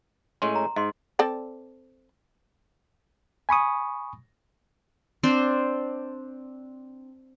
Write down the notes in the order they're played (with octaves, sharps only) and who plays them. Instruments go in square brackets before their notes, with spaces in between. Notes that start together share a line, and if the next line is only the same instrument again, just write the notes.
[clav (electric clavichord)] A2 G#3 C#4 [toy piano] C6
[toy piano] A#5
[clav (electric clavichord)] G#2 [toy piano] D#5 C6
[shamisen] C4 A4 D5
[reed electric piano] G#5 B5 C#6 D#6
[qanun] C4 D4 C5